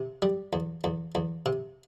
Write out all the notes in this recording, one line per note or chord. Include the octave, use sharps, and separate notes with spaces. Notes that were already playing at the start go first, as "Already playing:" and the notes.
Already playing: C3
G3
E2
E2
E2
C3